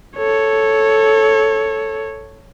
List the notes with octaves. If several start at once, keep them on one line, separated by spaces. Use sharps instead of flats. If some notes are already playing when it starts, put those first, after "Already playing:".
A4 C#5